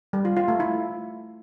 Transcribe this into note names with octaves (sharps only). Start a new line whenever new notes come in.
G3
F4
F4
A3
E4